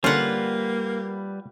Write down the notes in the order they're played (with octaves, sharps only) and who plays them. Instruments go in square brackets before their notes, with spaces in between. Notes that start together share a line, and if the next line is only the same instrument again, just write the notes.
[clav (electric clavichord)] D3 C#4 [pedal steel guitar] G3 B4 [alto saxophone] A#3 [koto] F4 F#5